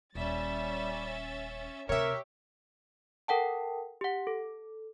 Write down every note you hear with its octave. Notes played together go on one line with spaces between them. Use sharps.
D#1 G3 C#4 E5 A6
D2 C3 G4 A#4 C#5 E5
A4 A#4 F#5 G5 A5
G4 F#5
A4